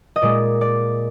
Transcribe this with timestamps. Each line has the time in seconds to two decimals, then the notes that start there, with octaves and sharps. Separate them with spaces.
0.16 D#5
0.22 A#2 G#3 D5
0.61 D5